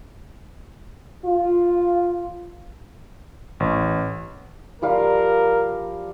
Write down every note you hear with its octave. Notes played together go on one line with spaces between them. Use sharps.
F4
A1
F3 G3 A#4 F5